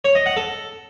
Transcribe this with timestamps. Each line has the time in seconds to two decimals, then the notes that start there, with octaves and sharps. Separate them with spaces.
0.05 C#5
0.15 D#5
0.26 F#5
0.37 A4